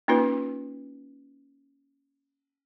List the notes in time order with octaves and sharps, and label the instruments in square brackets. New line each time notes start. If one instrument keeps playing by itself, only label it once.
[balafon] A#3 C#4 D#4 F4 B4